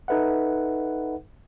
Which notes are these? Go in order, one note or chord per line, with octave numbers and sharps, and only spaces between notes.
D#4 A4 B4 E5 F#5